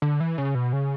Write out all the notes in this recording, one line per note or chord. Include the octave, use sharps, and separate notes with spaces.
D3
E3
C#3
B2
C#3